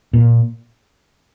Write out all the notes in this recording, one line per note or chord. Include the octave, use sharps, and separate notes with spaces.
A#2